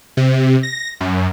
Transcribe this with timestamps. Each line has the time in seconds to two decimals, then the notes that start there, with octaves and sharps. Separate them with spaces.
0.17 C3
0.63 A#6
1.00 F#2